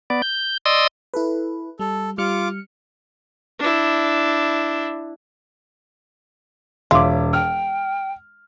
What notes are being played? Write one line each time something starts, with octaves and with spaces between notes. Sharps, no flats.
B3 D5
G6
D5 D#5 C6 D#6 E6
E4 A4 B4
G3 A4
G3 F4 D6 F6 C#7
D4 E4
E1 F4 C#5 E5 D6
G5 F6